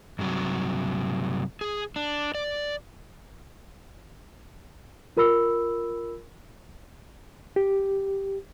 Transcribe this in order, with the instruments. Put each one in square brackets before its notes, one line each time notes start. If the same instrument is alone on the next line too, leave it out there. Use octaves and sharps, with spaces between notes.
[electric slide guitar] G2 C3 F#3
G#4
D4
D5
[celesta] F4 A#4 B5 E6
[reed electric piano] G4